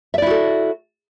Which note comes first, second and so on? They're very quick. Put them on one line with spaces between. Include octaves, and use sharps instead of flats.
E5 D5 E4 F#4 A4